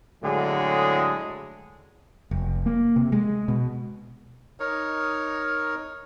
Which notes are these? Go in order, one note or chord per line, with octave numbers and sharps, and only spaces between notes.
A2 D3 F#3 G#3 G#4
F1
A#3
C3
G#3
B2
D#4 A#4 C#5